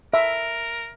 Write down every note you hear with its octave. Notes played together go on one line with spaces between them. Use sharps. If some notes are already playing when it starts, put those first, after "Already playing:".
A#4 E5